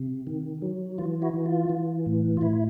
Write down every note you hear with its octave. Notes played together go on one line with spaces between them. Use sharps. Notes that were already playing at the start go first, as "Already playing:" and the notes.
Already playing: C3
D#3
F#3
E3 F4
E4 F#4
E3
F4
E3
A2
F4
A2 E4